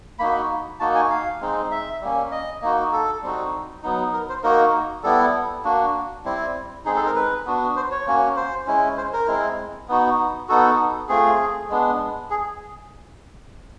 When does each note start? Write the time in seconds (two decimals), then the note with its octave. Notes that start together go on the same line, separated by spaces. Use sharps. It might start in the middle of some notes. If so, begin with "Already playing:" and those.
0.19 A#3 D#4 F#4 B5
0.80 A#3 D#4 F#4 A5
0.95 G#5
1.10 F5
1.41 G#3 C4 D#4
1.71 E5
2.01 G3 A#3 C#4
2.32 D#5
2.62 A#3 D#4 F#4
2.93 A4
3.22 G3 C4 D#4 F#4
3.83 F#3 B3 D#4
4.13 A#4
4.29 C5
4.43 A#3 D#4 F#4 A#4
5.03 G3 B3 E4 A4
5.65 A#3 D4 F#4
6.25 G3 C4 E4
6.85 G#3 C4 D#4 G#4
6.96 A4
7.06 A#4
7.16 B4
7.46 B3 D4 F#4
7.76 C5
7.91 C#5
8.07 A#3 C#4 F#4
8.36 C5
8.67 G#3 C#4 E4
8.97 C5
9.13 A#4
9.27 G#3 C4 E4
9.89 B3 D#4 F#4
10.49 B3 D#4 F#4 A4
11.09 A3 C4 F4 G#4
11.70 G#3 B3 D4
12.30 G#4